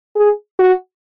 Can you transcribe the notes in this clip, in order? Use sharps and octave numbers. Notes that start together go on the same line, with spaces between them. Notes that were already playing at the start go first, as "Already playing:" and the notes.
G#4
F#4